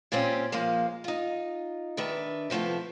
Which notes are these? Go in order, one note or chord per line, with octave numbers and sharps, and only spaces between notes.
A#2 G3 C4 C#4 G4
F3 G#3 A#3
D#4 F4
D#3 D4 B4 E5
C3 F3 A3 B3 E4